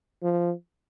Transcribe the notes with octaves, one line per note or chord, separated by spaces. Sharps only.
F3